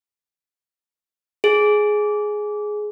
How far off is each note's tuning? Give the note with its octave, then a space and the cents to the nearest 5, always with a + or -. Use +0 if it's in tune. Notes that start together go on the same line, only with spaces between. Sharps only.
G#4 +10